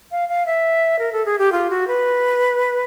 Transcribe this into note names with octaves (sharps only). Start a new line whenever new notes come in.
F5
F5
E5
A#4
A4
G#4
G4
F4
F#4
B4